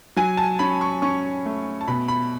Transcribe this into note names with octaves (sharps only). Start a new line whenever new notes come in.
F#3 G#5
A5
C#4 B5
C#6
C#4 C#6
A3
A5
B2 B5
B5